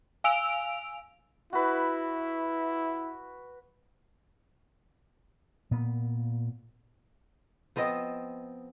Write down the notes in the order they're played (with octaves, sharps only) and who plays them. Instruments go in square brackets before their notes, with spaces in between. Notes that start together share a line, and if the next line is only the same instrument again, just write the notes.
[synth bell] F5 G#5 E6 D7 F7
[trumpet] E4 [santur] F#4 B4
[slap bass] A#2 B3
[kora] F3 B3 C4 D#5